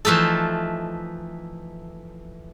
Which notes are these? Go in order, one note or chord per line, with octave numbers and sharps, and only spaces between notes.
E3 F3 A3 D#4 A4